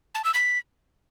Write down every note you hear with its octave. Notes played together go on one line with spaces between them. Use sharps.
A5
E6
B6